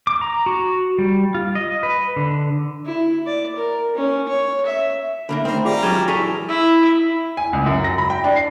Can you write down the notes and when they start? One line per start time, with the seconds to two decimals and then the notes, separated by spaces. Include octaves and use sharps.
0.07 D6
0.21 A#5
0.46 F#4
0.98 G3
1.35 F4
1.55 D#5
1.83 B4
2.16 D3
2.86 E4
3.27 D5
3.56 A#4
3.96 C#4
4.29 C#5
4.66 E5
5.29 D3 A#3 D#4 A#4 E5 B5
5.45 D#3 A3 C4 A#4 C5
5.65 G3 F4 G#4 D5 A#5 D6
5.83 F#3 G#3 C#4 F6 G#6 A6 E7 G7
6.08 E3 G#4 A4 C#6 B6 F7
6.49 E4
7.37 G#5
7.53 C#2
7.66 F#2
7.84 A#6
7.98 B5
8.10 G5
8.24 D4
8.36 C7